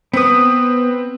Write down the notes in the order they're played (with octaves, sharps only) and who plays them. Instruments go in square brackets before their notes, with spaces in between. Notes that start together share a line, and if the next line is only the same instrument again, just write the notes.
[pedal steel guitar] B3 D#6 [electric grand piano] C4 B4